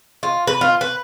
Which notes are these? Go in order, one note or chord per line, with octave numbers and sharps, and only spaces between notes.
F4
B4
F4
B4